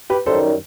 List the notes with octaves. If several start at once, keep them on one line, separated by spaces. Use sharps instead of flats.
G4 B4
F#2 D#3 G3 D#4 A4 C5